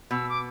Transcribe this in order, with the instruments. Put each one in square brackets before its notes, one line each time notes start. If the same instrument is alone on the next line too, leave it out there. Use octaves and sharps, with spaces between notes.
[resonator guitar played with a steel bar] B2 [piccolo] E6
[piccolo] D6